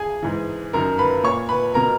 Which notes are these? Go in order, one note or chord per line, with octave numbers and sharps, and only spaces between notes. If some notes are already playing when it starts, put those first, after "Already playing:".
Already playing: G#4 G#5
G#2 E3
F#2 D#3 A#4 A#5
B4 B5
A#2 C#5 C#6
B4 B5
B2 A#4 A#5